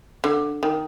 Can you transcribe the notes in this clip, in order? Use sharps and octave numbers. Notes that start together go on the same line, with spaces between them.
D3
D#3